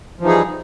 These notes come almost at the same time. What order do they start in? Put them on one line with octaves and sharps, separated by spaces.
F3 E3 D#4 G#4 G3